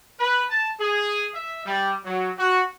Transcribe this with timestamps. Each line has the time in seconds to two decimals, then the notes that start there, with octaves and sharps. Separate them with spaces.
0.20 B4
0.50 A5
0.80 G#4
1.34 E5
1.66 G3
2.04 F#3
2.37 F#4